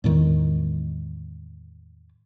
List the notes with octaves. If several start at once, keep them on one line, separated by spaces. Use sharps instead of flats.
E2 A2 D#3 G#3